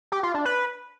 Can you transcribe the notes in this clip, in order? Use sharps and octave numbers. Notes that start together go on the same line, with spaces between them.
G4
F4
D4
B4